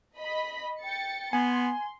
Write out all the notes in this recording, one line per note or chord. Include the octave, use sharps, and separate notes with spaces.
D#5 B5 B6
G5 A6 C#7
B3 G#5 C6